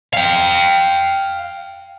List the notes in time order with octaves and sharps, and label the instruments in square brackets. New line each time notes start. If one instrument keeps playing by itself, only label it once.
[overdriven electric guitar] F5 G5